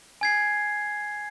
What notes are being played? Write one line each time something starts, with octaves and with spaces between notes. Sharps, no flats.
G#5 G#6 C7